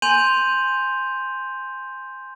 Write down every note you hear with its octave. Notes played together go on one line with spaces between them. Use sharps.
G#5 C6 G6 D#7 F7 F#7